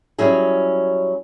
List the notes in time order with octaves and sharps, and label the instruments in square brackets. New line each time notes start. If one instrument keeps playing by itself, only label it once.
[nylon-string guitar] F#3 G3 C#4 E4 G#4